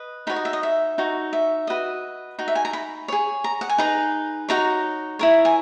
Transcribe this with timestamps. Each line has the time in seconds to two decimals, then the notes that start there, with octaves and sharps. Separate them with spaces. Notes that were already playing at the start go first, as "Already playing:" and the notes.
Already playing: B4 D#5
0.27 D#4 F#4 C#5 B5
0.36 D#5
0.45 E5
0.53 D#5
0.63 E5
0.98 D#4 F#4 C#5
1.33 E5
1.67 F#4 B4 D#5
2.39 D#4 F#4
2.48 E5
2.55 G#5
2.65 A#5
2.73 B5
3.08 G#4 C#5
3.44 A#5
3.61 F#5
3.69 G#5
3.78 D#4 G#4 B4 A#5
4.49 D#4 F#4 C#5 A#5
5.19 E4 A#4 C#5
5.45 G#5